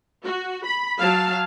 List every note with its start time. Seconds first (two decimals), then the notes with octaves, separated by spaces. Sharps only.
0.25 F#4
0.66 B5
0.99 F#3 F5 A5